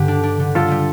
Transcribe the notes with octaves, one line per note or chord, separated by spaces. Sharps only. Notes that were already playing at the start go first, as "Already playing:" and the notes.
Already playing: G2 D3 G3 G4
D4
D4
D3
G3 F4 A4
G3